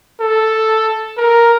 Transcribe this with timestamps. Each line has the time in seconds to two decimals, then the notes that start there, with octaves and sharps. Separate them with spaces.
0.20 A4
1.18 A#4